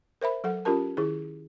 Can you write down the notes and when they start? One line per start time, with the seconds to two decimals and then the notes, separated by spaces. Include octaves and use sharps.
0.21 A#4 C5 E5 B5
0.44 F#3 A4 F#5
0.65 C#4 F4 G4 A#4 A5
0.97 D#3 E4 G#4